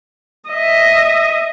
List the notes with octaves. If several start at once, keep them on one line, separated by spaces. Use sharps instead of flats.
D#5 E5